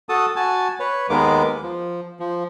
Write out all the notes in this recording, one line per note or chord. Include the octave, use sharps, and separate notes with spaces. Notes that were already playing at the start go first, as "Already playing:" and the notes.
F#4 A4 A5 D#6
F#4 G#5 A5
B4 C#5
D#2 G#3 A#3 B3 D6
F3
F3